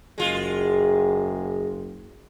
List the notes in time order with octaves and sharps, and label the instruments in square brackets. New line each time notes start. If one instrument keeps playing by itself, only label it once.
[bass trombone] F#1 [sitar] G#3 F4